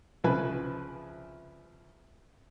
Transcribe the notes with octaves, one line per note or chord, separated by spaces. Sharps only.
C2 C#3 F3 B4 G#5